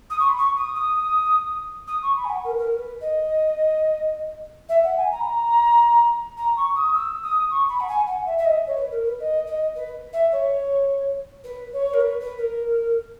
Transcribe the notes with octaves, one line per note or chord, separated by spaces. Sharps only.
D#6
C#6
B5
C#6
D#6
D#6
D#6
C#6
B5
G#5
F#5
A#4
B4
A#4
B4
D#5
E5
F#5
G#5
A#5
B5
A#5
A#5
C#6
D#6
E6
D#6
C#6
B5
F#5
G#5
F#5
E5
E5
D#5
C#5
B4
A#4
B4
D#5
D#5
B4
E5
C#5
B4
C#5
A#4
B4
B4
A#4